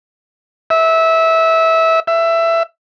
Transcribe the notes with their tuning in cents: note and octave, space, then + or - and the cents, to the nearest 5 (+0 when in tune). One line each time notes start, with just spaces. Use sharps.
E5 -20
E5 +15